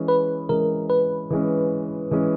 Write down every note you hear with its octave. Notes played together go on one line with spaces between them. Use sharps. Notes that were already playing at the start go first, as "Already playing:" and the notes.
Already playing: E3 G#3 C#4
B4
E3 G#3 C#4 A#4
B4
E3 G#3 C#4
E3 G#3 C#4